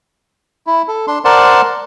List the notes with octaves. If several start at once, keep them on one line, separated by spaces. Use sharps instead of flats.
E4
A4
D4 C6
A#4 C5 D5 F#5 A5 C6